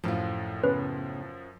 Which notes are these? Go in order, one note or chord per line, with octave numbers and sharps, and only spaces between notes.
F#2 A2 F3 F4
C#3 B3 C#4 B4